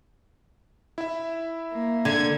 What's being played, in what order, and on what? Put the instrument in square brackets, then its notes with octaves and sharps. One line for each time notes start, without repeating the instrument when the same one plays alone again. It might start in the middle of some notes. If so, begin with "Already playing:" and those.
[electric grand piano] E4 E5
[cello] A#3
[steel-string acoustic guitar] D3 [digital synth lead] G#6